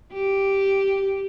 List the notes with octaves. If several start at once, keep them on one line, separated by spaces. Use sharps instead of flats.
G4